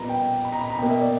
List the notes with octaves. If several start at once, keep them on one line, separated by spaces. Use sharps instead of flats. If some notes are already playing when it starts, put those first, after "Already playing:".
Already playing: A#2 G3 B3 A#5 B5
G5
B5
A#5
B5
A#5
B2 A#3 G5
E5
D5